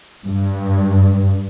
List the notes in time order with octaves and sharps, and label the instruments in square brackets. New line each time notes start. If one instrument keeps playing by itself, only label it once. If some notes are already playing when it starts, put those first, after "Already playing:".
[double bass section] G2